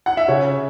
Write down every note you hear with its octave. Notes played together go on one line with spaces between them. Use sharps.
F#5
E5
C#3 C#5